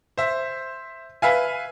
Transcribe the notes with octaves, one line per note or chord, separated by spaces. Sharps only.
C5 E5
B4 E5 F5 G#5